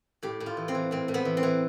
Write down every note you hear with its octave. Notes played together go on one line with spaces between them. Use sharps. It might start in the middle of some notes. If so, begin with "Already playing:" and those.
A2 G4
A2
F4
E3
C4
E3
A2 C4
A2
B3
E3
C4
E3